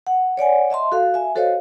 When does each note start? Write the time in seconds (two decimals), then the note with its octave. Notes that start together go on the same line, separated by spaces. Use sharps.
0.07 F#5
0.37 C#5 D5 F#5 G#5
0.70 D#5 E5 A5 C6
0.92 F#4 A4 F5
1.14 E5 G#5
1.35 F#4 A4 C5 C#5 D#5 F5